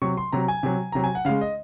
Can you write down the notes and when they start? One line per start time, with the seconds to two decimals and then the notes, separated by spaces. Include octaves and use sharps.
0.02 C3 F#3 C#6
0.17 C6
0.32 C3 F#3 A#5
0.48 G#5
0.63 C3 F#3
0.92 C3 F#3 A#5
1.04 G#5
1.15 F#5
1.25 C#3 G#3 F5
1.41 D#5